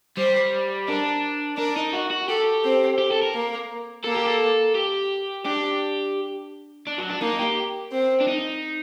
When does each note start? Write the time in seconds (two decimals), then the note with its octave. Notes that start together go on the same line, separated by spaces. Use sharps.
0.17 G3 C5
0.88 D4 A#4
1.57 D4 A#4
1.76 D#4
1.93 F#4
2.10 F#4
2.28 G4 A4
2.64 C4
2.98 G4
3.11 A4
3.22 A#4
3.34 A#3
4.04 A#3 A4
4.16 G4
4.26 A4
4.75 G4
5.45 D4 G4
6.87 D4
6.98 F#3
7.09 D4
7.21 A#3 D#4
7.39 G4
7.92 C4
8.20 D4
8.28 D#4